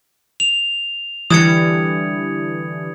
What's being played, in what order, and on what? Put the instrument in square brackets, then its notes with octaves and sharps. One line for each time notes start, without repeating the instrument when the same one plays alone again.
[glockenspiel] F7
[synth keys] D3 E3 G3 [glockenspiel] D#6 G#6 C#7